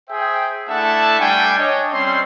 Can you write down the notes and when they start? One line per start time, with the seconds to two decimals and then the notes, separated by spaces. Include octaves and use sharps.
0.10 G#4 C5 E5 G5
0.69 A3 D4 E4 E5 F#5 A5
1.20 G3 A3 D4 G5 G#5
1.59 D4 C#5 D#5
1.93 G3 C4 C#4 C6